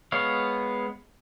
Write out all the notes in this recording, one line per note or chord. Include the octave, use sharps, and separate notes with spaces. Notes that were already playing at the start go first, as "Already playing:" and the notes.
G#3 B3 C#5 F5